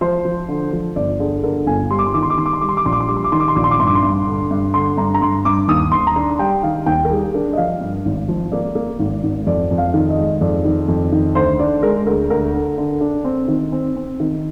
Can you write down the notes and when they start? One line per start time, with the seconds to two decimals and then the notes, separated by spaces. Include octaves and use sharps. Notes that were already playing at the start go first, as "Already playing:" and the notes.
0.01 F3 C5
0.25 F3
0.48 D3
0.73 F3
0.96 G1 D5
1.19 D3 G#4
1.43 D3 A#4
1.66 G1 G#5
1.91 G3 C6
1.99 D6
2.06 C6
2.14 D#3 D6
2.23 C6
2.30 D6
2.38 D#3 C6
2.46 D6
2.53 C6
2.61 G3 D6
2.69 C6
2.77 D6
2.85 A#1 C6
2.92 D6
3.00 C6
3.08 G3 D6
3.17 C6
3.24 D6
3.32 D#3 C6
3.40 D6
3.48 C6
3.56 A#1 D6
3.64 C6
3.71 D6
3.80 G2 C6
3.87 D6
3.95 C6
4.03 G2
4.27 D3
4.51 G2
4.74 D3 C6
4.97 G2 A#5
5.14 A#5
5.21 G2 C6
5.45 G2 D6
5.68 D#2 D#6
5.92 D#2 C6
6.07 A#5
6.16 D4 C6
6.39 G3 G5
6.63 D#3 F5
6.86 D#2 G5
7.05 A#4
7.10 G3 G#4
7.34 D4 A#4
7.53 D#5
7.57 F3 F5
7.81 G2
8.05 G#1
8.28 F3
8.52 A#3 D5
8.75 A#3
8.99 G#1
9.24 G#1
9.47 F2 D5
9.71 F2
9.78 F5
9.94 D#3
10.10 D#5
10.18 G#3
10.41 F2 D5
10.65 D#3
10.88 F2
11.12 D#3
11.35 D2 C5
11.59 D4 D5
11.82 G#3 A#4
12.07 D2 A#4
12.30 D2 A#4
12.53 D3
12.78 D3
13.01 D4
13.24 C4
13.48 D#3
13.72 C4
13.96 C4
14.20 D#3